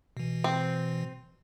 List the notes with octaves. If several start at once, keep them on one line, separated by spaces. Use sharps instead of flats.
B2 E3
C4